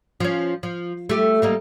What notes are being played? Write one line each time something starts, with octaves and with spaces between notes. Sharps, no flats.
F3 C#4
F3
A3 G4
G3 A#3 D#4